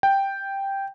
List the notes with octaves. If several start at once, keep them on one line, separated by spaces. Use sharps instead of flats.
G5